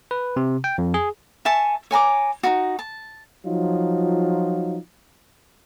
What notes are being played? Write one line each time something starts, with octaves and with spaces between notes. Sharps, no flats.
B4
C3
G5
F2
G#4
E5 G#5 A5 C#6
C#5 G#5 A#5 D6
D#4 E4 F#4
A5
F3 F#3 D#4 F4